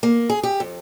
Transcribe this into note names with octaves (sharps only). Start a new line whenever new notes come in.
A#3
G#4
G4
F2